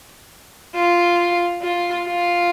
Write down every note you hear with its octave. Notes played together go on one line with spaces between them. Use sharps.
F4
F4
F4